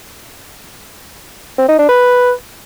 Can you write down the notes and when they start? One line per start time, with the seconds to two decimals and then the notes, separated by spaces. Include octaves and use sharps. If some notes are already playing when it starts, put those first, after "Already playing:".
1.58 C4
1.68 D#4
1.79 D4
1.89 B4